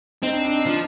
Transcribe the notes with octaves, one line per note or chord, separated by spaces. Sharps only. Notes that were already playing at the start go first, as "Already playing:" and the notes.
C4 D#4
D4
D4
D#4
F3 D4